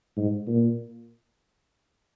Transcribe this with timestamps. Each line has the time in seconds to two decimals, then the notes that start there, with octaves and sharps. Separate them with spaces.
0.17 G#2
0.47 A#2